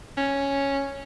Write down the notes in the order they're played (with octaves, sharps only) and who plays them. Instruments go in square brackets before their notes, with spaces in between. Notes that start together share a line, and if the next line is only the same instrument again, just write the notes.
[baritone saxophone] C#4